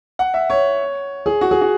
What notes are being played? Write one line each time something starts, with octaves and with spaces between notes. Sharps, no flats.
F#5
E5
C#5
G#4
F#4
G#4
F#4